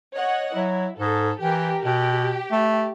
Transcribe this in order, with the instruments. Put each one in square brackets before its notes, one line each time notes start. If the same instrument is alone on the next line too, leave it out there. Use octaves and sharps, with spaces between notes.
[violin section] C#5 D#5 F#5
[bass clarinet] F#3 [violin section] E4
[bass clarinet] G#2 [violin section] A4
[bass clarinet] E3 [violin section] G4 A#4
[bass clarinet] B2 [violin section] G4
[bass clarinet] A3